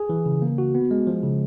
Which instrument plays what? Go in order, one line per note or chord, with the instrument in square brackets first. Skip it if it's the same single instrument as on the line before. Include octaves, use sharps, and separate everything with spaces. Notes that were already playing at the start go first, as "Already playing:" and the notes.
Already playing: [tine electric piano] G#4
E3
C#3
A#3
F#4
B3
G#3
F3
C#3